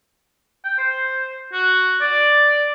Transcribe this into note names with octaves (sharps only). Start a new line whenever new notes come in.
G5
C5
F#4
D5